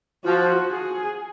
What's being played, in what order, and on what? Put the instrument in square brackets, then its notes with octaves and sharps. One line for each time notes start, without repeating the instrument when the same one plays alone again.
[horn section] F3 [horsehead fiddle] F#4
[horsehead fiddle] G#4